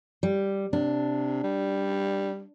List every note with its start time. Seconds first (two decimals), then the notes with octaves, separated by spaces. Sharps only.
0.23 G3
0.73 C3 D4
1.43 G3